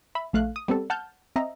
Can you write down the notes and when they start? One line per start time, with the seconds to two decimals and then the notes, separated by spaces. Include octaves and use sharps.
0.15 E5 B5
0.33 A#1 A3 F5 F#6
0.56 D#6
0.68 G3 B3 C4 A4
0.90 F#5 A5 F6 G6
1.36 C4 D#5 E5 A#5